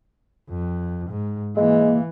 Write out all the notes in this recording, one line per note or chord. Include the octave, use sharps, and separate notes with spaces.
F2
G#2
E3 G#3 A#3